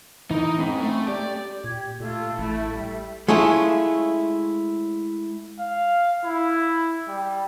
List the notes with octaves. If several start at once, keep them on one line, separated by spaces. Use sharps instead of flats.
E3 D#4 A#4
G#2 C4 C#4 B5
A3
G4 D5
A#2 G4 G#6
A#2 A3 F4 A4
A1 A3 E4
G3 E5
G#3 A3 C#4 E4 F4
F5
E4
G3